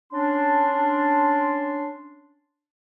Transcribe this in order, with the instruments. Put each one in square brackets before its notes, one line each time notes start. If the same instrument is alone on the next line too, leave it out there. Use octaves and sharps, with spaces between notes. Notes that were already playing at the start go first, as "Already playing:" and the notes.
[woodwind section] C#4 D4 C6